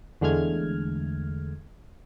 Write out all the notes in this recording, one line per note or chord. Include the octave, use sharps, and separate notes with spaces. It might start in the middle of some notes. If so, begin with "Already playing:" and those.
E2 D3 G#3 A3 F6 G#6